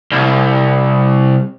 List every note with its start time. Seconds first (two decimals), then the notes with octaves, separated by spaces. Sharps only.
0.11 C2